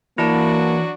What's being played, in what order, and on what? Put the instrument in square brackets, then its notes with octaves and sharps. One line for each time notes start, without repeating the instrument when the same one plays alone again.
[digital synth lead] E3 [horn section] F#3 D4 F#4 [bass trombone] A#3 [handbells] E4 A5